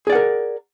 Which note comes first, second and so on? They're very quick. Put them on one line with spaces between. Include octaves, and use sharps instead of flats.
G#4 D5 F#5 A#4